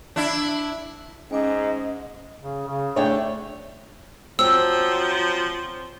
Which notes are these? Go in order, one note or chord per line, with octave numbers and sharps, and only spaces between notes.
D4 E4
G#2 C#4 D#5 G#5 D6
C#3
C#3
A3 D4 G#4 C#5 D5 G5
F3 F#3 C4 E6